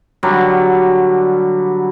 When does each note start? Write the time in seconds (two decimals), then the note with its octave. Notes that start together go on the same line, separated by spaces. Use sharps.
0.23 D3 F#3 G3